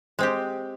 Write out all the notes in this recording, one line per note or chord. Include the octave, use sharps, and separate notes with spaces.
G#3 C4 G4